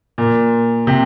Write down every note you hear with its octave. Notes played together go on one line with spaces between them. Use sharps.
A#2
C3